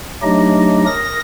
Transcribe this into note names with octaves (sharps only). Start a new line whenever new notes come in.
F#3 A3 D4 D#4 G4 D#5
A#4 D#6 A#6